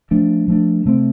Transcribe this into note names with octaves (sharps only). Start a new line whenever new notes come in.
F3 A3 D4
F3 A3 D4
C3 A3 C4